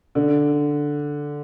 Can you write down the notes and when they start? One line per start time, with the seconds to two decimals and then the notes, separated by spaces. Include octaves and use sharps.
0.15 D3